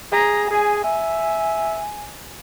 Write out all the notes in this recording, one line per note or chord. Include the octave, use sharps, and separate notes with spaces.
G#4 A#5
G#4 G#5
E5 G#5